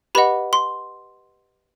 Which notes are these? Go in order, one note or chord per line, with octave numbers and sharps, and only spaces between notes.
G4 B4 D#5 F#5 B5
C6